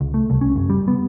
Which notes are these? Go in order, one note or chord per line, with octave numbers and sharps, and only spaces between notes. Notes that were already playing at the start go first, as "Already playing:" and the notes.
C#2
A3
C2
C#4
F#1
G3
B3